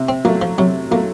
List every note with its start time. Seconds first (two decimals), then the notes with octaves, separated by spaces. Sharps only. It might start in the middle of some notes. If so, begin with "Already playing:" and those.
Already playing: C3
0.09 C4
0.25 F#3 A3 A#3
0.42 F3
0.58 C3 F#3
0.91 F#3 A3 A#3